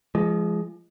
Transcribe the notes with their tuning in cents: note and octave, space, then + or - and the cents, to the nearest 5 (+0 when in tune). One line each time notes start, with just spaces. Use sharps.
F3 -30 G#3 +0